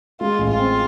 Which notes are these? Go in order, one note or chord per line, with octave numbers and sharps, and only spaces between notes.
G#3 F4
A1
F4
C4